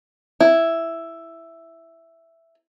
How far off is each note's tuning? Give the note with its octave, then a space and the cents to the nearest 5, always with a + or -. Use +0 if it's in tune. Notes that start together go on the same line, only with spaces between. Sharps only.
E4 +5